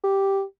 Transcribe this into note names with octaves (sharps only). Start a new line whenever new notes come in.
G4